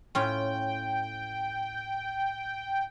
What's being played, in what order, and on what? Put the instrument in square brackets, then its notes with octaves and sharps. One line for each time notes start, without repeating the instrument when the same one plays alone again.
[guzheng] A2 C#4 F4 [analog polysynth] G5